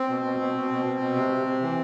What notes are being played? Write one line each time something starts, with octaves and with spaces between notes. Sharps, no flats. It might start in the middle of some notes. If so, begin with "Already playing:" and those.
Already playing: C4
B2
B2
B2
B2
B2
B2
B2
C3
C3
C3
E3